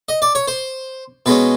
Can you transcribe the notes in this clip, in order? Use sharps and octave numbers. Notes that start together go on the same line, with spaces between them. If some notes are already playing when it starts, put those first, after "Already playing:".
D#5
D5
C#5
C5
B2 G#3 C#4 B4